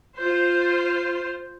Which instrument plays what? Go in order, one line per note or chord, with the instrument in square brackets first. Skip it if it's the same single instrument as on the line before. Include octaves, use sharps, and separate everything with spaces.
[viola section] F4 C5